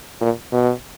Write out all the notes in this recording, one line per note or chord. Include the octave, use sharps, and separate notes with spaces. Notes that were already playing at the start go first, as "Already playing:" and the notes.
A#2
B2